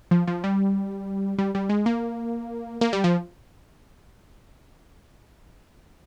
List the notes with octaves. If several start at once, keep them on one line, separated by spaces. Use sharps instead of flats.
F3
F3
G3
G3
G3
G#3
A#3
A#3
G3
F3